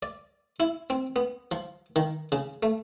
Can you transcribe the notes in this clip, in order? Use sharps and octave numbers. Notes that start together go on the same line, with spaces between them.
D5
E4
C4
B3
F3
D#3
C#3
A3